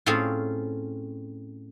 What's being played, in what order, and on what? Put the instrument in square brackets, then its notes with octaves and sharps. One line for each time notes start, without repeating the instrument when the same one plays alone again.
[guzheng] A2 C4 C#4 F4 G#4